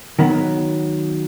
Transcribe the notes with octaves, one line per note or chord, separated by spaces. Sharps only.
D#3 F#3 B3